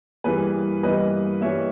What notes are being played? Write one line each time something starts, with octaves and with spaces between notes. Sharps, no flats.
G2 E3 G3 A#3 G#4 B4
G2 E3 G3 A#3 B4 D#5
G2 E3 G3 A#3 C#5 E5